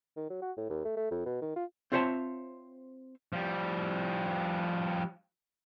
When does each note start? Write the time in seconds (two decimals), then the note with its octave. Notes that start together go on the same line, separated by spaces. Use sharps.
0.17 D#3
0.30 F#3
0.42 F#4
0.57 A2
0.70 D#2
0.85 A3
0.97 A3
1.11 F2
1.26 B2
1.42 D#3
1.56 F4
1.92 C4 F4 C5 C#5 E5 A5
3.33 F3 G3